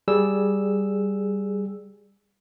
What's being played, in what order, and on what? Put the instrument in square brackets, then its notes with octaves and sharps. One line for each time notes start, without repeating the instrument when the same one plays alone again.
[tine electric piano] G3 G#4 E6